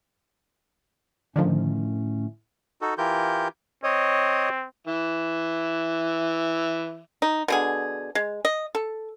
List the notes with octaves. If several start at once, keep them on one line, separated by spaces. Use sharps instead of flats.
A2 D3 D#3 F3 A3 C#4
D#4 F#4 A4
E3 E4 F4 G4 A#4 G6
C4 C#5 D#5
E3 E5
D#4
B2 D3 G#4
G#3
D#5
A4